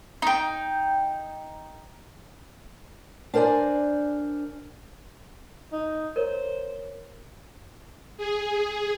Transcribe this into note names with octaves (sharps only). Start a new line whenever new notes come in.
D#4 G5
D4 A#4 C5 D5 G#5
D#4
A#4 C5 C#5
G#4